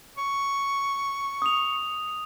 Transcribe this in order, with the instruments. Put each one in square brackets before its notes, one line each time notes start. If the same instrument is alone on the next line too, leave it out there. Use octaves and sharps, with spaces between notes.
[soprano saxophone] C#6
[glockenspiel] D#6 F7